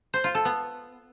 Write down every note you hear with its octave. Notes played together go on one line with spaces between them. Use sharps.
C5
F4
A4
B3